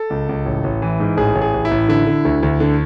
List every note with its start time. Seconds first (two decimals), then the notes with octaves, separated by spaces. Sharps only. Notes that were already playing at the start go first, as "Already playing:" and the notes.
Already playing: A4
0.10 C#2
0.29 C#2
0.46 A1
0.64 A1
0.82 E3
1.00 G#2
1.17 A1 G#4
1.35 A1
1.41 G#4
1.54 A1
1.65 E4
1.71 A1
1.89 D3 E4
2.06 D3
2.25 D2
2.43 D2
2.60 D3